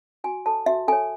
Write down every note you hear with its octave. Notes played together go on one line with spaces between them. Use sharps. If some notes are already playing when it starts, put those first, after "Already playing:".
F#4 G#5
A4 C#5 A5
F#4 E5
A4 C#5 G#5